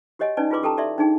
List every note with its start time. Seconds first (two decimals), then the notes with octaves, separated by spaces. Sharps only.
0.19 F#4 G4 C#5 D#5 F#5 G#5
0.37 C#4 D#4 B4 D5 G#5 A5
0.50 E4 F4 G#4 B4 C6 D6
0.63 G4 A4 G5 A5 A#5
0.77 G4 A4 D5 E5 C6
0.98 D4 D#4 G#4 G5